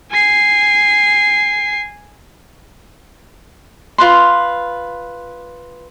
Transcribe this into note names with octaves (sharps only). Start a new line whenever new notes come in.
G#5 C7
F4 B4 C6